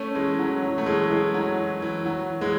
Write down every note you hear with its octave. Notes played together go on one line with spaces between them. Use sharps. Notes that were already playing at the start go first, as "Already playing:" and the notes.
Already playing: A3 C#4
E3 G#3
F#3
F#3
A3
E3 G#3
E3 G#3
F#3
E3
F#3
E3 G#3